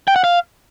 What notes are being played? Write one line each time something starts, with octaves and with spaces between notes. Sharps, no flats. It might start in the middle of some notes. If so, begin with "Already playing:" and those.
G5
F#5
F5